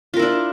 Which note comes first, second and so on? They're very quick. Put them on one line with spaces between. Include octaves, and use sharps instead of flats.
F4 A#4 E4 D4